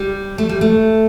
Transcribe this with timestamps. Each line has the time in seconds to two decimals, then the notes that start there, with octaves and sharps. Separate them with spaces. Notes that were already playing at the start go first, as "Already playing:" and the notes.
Already playing: G3
0.38 A3
0.49 G3
0.61 A3